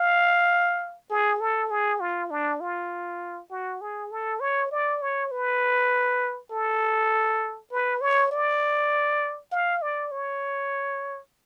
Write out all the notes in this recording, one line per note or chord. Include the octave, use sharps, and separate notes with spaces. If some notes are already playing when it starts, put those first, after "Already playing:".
Already playing: F5
G#4
A4
G#4
F4
D4
F4
F#4
G#4
A4
C#5
D5
C#5
B4
A4
B4
C#5
D5
F5
D5
C#5